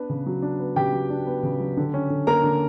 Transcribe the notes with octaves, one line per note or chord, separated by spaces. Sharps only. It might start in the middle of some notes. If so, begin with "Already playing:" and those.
Already playing: B3 D4 B4
C#3
F#3
D4
B3
C#3 G4 G5
F#3
D4
B3
C#3
F#3
D3
C#4
D3
A#3 A#4 A#5
D3